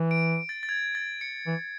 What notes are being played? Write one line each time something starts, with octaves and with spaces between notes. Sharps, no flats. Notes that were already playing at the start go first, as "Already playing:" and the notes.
Already playing: E3
D7
A6
A6
G#6
A6
C#7
E3